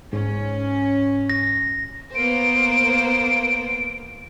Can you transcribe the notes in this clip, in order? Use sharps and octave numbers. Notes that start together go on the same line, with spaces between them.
G#2 C#4
A#6
A#3 B3 C5 D7